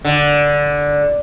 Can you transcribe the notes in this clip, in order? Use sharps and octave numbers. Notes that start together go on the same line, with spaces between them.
D3